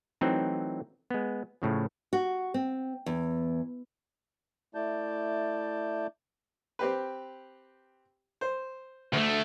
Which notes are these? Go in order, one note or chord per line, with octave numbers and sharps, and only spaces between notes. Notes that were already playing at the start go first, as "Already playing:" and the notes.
E3 F#3 A3 C4 D#4
G#3 B3
A2 C#3 F3
F#4
C4
E2
A3 E4 D5 A5 G6
C4 G4 B4
C5
D2 A3